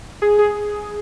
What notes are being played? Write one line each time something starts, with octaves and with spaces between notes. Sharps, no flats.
G#4
G#4